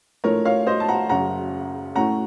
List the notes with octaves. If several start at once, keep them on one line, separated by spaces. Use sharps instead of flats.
A#1 A2 F3 A3 A#4 C#5
C#5 F5
C5 D#5
A5
F#5 A#5
F#1 F#2 C#3 F#3 F#5 A#5
A2 A3 C#4 F#5 A#5